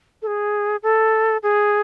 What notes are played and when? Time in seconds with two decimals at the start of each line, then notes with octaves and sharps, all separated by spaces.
0.22 A4
0.27 G#4
0.83 A4
1.43 G#4